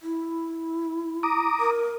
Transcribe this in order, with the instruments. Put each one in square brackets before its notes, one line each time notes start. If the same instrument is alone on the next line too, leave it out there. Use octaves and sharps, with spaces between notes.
[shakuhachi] E4
[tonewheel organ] A#5 D6 D#6
[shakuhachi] A#4